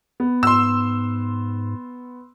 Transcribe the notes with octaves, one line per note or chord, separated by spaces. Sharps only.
B3
G#2 C6 E6